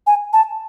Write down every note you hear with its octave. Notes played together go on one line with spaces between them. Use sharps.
G#5
A5